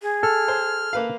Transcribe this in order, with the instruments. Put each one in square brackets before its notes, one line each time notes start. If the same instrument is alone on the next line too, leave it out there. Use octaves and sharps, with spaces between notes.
[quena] G#4
[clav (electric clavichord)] A4 [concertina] F6
[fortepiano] C5
A#3 B4 F5